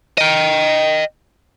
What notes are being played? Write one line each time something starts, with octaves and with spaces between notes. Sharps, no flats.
D#5 G5